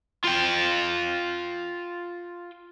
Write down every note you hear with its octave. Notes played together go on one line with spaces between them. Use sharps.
F4 G5